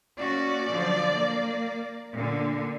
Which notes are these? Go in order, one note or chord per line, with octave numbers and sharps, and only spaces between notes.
A#3 C#4 F#4 D5
D3 F3 F#3
A#3
A#2 D3